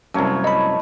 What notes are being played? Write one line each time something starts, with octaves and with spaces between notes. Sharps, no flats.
C2 F#2 A3 A#3 C#5
E4 D#5 B5